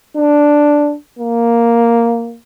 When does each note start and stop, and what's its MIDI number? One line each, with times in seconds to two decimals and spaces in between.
0.17 0.95 62
1.19 2.37 58